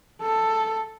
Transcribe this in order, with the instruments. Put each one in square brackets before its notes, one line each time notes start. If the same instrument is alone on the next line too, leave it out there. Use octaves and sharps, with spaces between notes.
[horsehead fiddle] A4